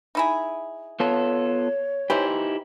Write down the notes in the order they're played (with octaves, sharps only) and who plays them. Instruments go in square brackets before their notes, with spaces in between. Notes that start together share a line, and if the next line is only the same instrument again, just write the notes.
[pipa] D#4 E4 G#4
[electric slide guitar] B3 F4 A4 [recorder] C#5
[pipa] E3 C5 [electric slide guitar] D#4 E4 G4